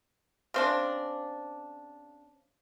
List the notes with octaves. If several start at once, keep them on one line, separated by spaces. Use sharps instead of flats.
C#3 C4 D4